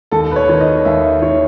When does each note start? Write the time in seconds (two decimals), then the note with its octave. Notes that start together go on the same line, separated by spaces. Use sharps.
0.11 D#2 A4
0.31 B4
0.36 C#5
0.49 D#3 C#5
0.60 D#5
0.85 D#2 E5
1.22 D#3 C#5